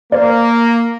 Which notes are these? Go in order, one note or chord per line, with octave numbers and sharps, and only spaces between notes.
A#3 C5 D5